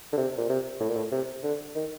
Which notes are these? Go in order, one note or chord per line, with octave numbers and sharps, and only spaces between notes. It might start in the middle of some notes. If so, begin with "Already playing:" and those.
D3
C3
A#2
C3
A2
A#2
A2
C3
D3
D#3